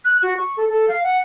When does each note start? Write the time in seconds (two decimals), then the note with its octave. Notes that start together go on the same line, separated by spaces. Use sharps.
0.05 F#6
0.22 F#4
0.37 C#6
0.57 A4
0.69 A4
0.88 F5
1.03 F#5